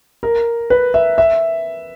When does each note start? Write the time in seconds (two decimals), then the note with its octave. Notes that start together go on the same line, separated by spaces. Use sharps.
0.23 A#4
0.70 B4
0.94 E5
1.18 E5